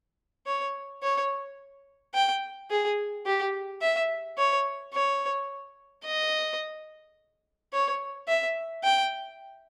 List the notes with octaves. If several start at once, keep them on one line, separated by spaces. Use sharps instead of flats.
C#5
C#5
G5
G#4
G4
E5
C#5
C#5
D#5
C#5
E5
G5